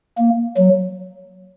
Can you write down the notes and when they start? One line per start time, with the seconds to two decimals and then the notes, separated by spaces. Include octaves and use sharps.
0.18 A#3
0.57 F#3